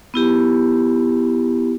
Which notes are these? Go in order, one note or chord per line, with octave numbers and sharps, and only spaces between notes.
B3 E4 G4